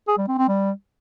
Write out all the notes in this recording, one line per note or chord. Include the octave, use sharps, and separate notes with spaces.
G#4
G3
C4
C4
G3